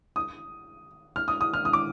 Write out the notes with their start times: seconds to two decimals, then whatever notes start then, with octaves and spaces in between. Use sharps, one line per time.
0.16 D#6
1.16 F6
1.28 D#6
1.41 D#6
1.54 F6
1.65 D#6
1.73 D6